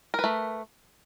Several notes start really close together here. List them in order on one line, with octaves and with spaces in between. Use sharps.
A#4 B4 A3